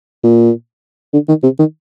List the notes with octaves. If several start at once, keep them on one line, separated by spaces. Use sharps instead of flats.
A#2
D3
D#3
C3
D#3